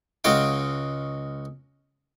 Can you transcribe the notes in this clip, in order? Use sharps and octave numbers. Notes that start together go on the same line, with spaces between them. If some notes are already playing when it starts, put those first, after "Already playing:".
C#2 G#3 F#4 F5 G5